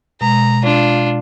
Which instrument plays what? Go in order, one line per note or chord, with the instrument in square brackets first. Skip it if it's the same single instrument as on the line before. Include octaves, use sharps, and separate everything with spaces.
[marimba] B2 G#3 [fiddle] A#5
[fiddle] D4 F4